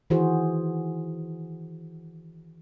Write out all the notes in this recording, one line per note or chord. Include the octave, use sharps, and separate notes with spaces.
D#3 E3 E4 F#4 G#4 C5